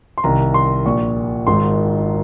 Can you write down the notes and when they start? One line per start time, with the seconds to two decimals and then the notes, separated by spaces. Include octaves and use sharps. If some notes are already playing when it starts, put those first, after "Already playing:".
0.18 C6
0.24 C2 C3 D#3 A#5
0.54 C6
0.85 A#1 A#2 C#6
1.47 G#1 G#2 D#3 C6